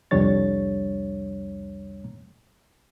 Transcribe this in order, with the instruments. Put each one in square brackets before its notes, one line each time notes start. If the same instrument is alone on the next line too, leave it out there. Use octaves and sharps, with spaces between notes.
[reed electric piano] C2 F2 G3 D4 C#5 A6